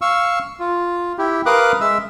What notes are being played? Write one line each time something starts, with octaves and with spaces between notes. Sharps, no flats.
F5 C#6 E6
F4
E4 G4
A#4 B4 F5 D6 D#6 F#6
G#3 E5 E6